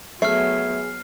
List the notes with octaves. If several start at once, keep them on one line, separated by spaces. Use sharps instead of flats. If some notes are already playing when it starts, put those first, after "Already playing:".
F#3 A3 B3 G#4 E5 F6 C7